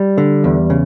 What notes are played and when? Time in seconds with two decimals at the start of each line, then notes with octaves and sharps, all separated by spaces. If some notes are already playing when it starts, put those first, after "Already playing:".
Already playing: G3
0.18 D3
0.44 E2
0.70 C#3